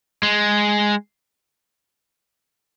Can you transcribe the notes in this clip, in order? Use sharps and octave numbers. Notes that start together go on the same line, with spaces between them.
G#3